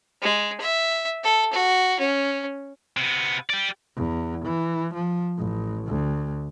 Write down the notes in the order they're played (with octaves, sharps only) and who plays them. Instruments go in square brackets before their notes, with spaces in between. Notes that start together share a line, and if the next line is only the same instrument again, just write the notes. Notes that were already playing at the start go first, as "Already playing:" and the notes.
[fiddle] G#3
E5
A4
F#4
C#4
[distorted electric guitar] C3 B3
G4 D5
[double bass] E2
E3
F3
A1
D2